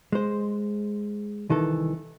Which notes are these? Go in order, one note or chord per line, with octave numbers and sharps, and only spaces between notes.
G#3 C5
C2 D#3 E3 A4